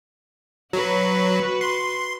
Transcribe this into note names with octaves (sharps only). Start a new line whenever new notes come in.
F#3 F#4 B4
C6